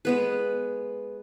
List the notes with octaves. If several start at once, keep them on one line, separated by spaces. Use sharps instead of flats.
G#3 B3 B4